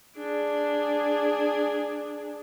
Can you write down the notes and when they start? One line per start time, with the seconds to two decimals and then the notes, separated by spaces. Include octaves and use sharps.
0.17 D4 G#4